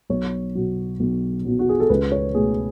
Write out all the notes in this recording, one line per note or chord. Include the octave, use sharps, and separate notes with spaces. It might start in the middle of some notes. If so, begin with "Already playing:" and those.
B1 C#5
B2 F#3
B1
B2 F#3
F#4
G#4
A4
C#2 B4
C#5
B2 A3 G#4